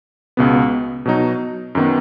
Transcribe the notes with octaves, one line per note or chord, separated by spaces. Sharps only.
C#2 B2 B3
B2 F#3 D#4
F#2 D#3 B3